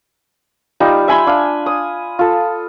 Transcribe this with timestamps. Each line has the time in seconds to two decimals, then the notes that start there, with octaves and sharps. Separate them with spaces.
0.80 G3 D#4 F4
1.08 E5 G#5 B5 C6
1.27 D4 F5
1.66 D#6
2.19 F4 A4